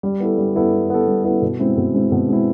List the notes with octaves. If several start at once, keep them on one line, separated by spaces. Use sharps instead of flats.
G3
B3 E4 A4
G3
B3 E4 A4
G3
B3 E4 A4
G3
B3 E4 A4
B2
G#3 C4 E4
B2
G#3 C4 E4
B2
G#3 C4 E4